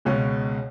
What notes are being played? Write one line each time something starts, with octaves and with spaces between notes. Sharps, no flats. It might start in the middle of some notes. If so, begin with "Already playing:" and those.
C#2 B2 G#3 C#4